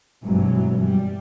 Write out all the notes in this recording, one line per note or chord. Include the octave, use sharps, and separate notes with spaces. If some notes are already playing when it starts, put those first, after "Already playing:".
G#1 G2 B2 E3 F#3
G3